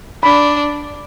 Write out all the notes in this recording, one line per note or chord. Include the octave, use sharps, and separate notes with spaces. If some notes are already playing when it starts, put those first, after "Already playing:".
D4 B5